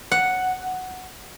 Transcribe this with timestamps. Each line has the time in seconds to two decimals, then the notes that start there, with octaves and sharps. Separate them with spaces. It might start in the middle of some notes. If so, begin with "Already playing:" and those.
0.12 F#5